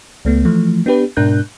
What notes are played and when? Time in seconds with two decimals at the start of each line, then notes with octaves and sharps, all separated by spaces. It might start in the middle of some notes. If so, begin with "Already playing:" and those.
0.25 C#2 A3 B3
0.45 E3 F3 A3
0.86 B3 D4 G4 B4
1.17 G#2 B2 D4 A#4 F#6 G6